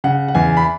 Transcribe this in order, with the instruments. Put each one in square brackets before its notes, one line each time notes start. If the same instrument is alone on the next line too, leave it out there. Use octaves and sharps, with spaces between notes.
[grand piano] C#3 F#5
F#5
E2 G#5
B5